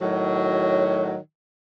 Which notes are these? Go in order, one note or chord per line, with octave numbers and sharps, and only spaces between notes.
A2 D#3 F#3